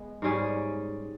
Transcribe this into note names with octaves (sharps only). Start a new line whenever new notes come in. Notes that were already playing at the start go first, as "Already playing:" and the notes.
Already playing: G#3 B3
G#2 G3 C#4 G#4